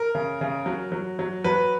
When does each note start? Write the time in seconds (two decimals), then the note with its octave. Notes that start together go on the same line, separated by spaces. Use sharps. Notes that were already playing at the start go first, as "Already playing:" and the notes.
Already playing: A#4
0.15 C#3
0.41 C#3
0.66 F#3
0.92 F#3
1.19 F#3
1.44 F#3 B4